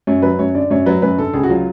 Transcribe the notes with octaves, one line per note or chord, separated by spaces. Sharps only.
F#2 C#5
F#3 B4
F#2 C#5
D3 D5
F#2 C#5
F#3 B4
F#2 B4
D3 A4
C#2 G#4
F#4
F#3 F4